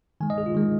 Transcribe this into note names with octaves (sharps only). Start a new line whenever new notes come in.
D#3 G#3 G#5
D#5
G#4
F4
D#3 G#3